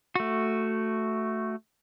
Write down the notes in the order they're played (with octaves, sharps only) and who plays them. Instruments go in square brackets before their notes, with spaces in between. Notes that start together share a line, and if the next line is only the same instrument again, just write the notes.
[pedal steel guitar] A3 F#4